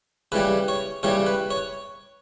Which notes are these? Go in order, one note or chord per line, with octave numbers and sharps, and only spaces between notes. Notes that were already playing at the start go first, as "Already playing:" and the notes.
C#3 E3 G3 B4
C#5
C#3 E3 G3 C#5
B4
C#5